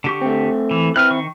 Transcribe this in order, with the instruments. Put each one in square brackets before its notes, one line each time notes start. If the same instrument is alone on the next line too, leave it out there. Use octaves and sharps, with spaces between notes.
[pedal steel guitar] D3 G4 C#6
[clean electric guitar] A3 C4
[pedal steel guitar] E3
[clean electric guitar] C4 E4 [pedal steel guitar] B4 F6 F#6
[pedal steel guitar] D#3 C#6